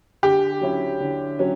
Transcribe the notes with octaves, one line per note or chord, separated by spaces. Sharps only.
D3 G4
F#3 C#4 E4
D3
F#3 C#4